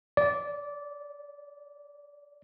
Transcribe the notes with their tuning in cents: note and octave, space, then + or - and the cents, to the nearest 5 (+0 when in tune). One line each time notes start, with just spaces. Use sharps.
D5 -15